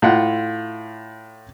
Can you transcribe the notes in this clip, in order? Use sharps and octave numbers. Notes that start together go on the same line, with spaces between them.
A2 F4 F#5